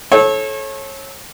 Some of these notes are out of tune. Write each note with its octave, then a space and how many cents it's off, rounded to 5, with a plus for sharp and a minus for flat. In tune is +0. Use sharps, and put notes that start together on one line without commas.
A4 -25 C#5 -30